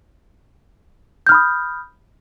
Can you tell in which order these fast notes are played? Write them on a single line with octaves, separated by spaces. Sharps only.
G6 F6 B5 D#6